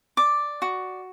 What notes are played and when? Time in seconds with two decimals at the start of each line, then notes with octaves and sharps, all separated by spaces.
0.17 D5 D6
0.62 F#4